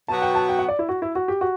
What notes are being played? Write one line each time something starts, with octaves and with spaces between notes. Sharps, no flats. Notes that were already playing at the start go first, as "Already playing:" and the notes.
B2 F#3 B3 F#4 A5
G5
A5
G5
F#5
D5
E4
F#4
E4
F#4
G4
F#4